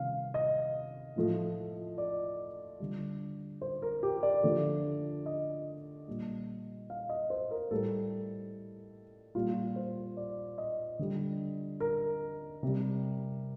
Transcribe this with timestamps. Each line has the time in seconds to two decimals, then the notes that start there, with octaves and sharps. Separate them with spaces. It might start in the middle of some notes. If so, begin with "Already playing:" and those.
Already playing: C3 D#3 G3 F5
0.34 D#5
1.16 A2 F3 A3
1.98 D5
2.80 D3 G3
3.62 C5
3.82 A#4
4.03 G4
4.23 D5
4.43 D3 F3 A3
5.26 D#5
6.08 A#2 G3
6.90 F5
7.09 D#5
7.30 C5
7.51 A#4
7.71 A2 G3 A4
9.35 A#2 G3 F4
9.76 C5
10.17 D5
10.58 D#5
10.99 D3 G3
11.80 A#4
12.63 C3 G3